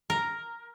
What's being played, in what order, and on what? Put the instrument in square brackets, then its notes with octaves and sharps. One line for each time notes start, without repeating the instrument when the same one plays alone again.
[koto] A#4